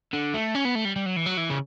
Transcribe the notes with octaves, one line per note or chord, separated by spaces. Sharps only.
D3
A3
C#4
B3
A3
G3
G3
F#3
E3
F#3
E3
C#3